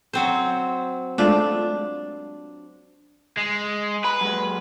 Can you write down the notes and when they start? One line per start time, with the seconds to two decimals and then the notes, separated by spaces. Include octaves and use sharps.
0.13 F#3 C4 C5
1.18 G#3 A3 D4 F4
3.37 G#3
4.05 B4 B5
4.21 F#3 G#3